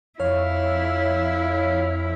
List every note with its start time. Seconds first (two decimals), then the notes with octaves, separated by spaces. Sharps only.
0.20 F2 E4 C#5 F5